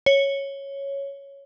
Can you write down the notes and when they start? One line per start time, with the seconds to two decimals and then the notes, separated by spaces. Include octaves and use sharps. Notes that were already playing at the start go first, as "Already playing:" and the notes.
0.06 C#5